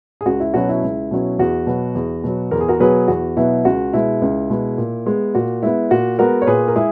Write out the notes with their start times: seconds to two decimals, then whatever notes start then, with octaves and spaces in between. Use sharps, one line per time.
0.21 G#4
0.26 C#2 F#4
0.40 E4
0.54 B2 F#3 C#4 F#4
0.69 E4
0.83 C#2
1.11 B2 F#3 C#4
1.39 E2 F#4
1.67 B2 F#3
1.95 E2
2.24 B2 F#3
2.51 E2 A#4
2.61 G#4
2.68 F#4 A#4
2.80 B2 F#3 B3 G#4 B4
3.08 E2 F#4
3.37 B2 F#3 B3 E4
3.65 C#2 F#4
3.93 B2 G#3 E4
4.22 C#2
4.50 B2 G#3
4.78 A#2
5.06 G#3 B3
5.35 A#2 F#4
5.63 G#3 B3 E4
5.91 A#2 F#4
6.19 G#3 B3 F#4 A#4
6.42 C#5
6.47 A#2 G#4 B4
6.68 A#4
6.75 G#3 E4 G#4